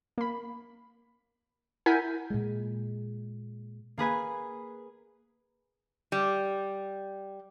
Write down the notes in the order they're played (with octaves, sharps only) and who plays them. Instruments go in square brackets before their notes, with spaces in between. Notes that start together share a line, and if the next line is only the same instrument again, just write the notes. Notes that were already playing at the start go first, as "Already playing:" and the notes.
[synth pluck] A#3 B5
E4 A#4 F#5 G#5 G6 B6
[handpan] A#2 G#3
[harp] A#3 G#4 B4 G#5
[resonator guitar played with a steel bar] G3